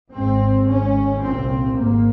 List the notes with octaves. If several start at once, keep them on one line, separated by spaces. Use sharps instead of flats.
G#1 G#2 C4
G#1 G#2 C#4
C2 A#2 C4
G#1 G#2 A#3